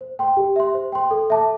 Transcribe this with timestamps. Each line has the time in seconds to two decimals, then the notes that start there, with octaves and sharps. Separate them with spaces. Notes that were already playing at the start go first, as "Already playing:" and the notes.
0.01 C5
0.19 G5 C6
0.37 G4
0.56 E5 C6
0.74 C5
0.92 G5 C6
1.11 A4
1.30 E5 A5 D6